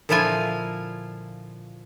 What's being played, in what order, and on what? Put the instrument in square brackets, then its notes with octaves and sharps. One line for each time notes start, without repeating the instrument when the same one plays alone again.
[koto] A#2 D3 F3 E4 F4 G#5